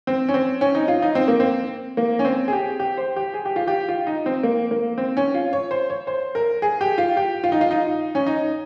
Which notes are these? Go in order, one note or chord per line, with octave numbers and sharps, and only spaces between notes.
C4
C#4
C4
C#4
D#4
F4
D#4
C4
A#3
C4
A#3
C#4
C4
G#4
G4
G4
C5
G4
G#4
G4
F4
G4
F4
D#4
C4
A#3
A#3
C4
C#4
F4
C#5
C5
C#5
C5
A#4
G#4
G4
F4
G4
F4
D#4
F4
D#4
C#4
D#4